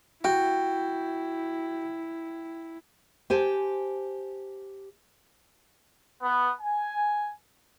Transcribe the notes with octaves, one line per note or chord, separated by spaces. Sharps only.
E4 F#4 G5
G4 C5 G#5 A5
B3
G#5